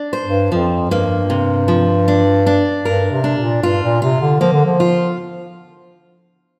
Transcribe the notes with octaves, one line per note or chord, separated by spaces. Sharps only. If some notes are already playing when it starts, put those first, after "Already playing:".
Already playing: D4
C5
G2
F2 F3
G2 A#3
C3
F3
D4
D4
G2 A#4
C3
D4
A#2
G2 F4
A#2
C3 F4
D3
F3 A#3
D3
F3
F4